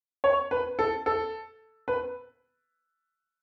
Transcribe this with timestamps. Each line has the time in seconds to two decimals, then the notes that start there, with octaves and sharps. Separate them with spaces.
0.24 C#5
0.51 B4
0.79 A4
1.06 A4
1.88 B4